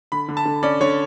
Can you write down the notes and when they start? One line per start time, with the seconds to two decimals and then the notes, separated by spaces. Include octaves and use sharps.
0.12 D3 B5
0.28 D3
0.37 A5
0.45 D3
0.63 C#4 D5
0.80 D3 C#5